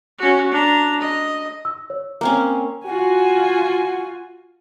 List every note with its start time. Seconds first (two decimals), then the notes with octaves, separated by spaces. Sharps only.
0.18 C#4 F#4
0.51 D4 A#5
1.00 D#5
1.65 E6
1.90 C#5
2.21 A#3 C4 C#4
2.85 F4 F#4 G#5